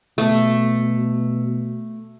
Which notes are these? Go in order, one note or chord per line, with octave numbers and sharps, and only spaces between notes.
B2 A3